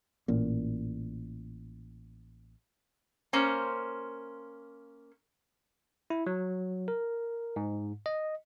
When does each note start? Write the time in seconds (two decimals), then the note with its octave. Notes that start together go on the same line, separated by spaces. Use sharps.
0.28 A1 A#2
3.33 A#3 C#4 C5
6.10 E4
6.26 F#3
6.88 A#4
7.56 G#2
8.06 D#5